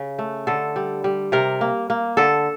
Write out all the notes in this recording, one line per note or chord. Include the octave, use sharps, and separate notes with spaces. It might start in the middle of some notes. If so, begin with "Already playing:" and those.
Already playing: C#3
A3
D3 A4
G3
G3
C3 A#4
A#3
A#3
D3 A4